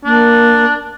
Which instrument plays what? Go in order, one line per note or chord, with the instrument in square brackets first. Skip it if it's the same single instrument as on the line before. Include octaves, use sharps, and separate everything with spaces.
[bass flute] A#3 [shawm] D4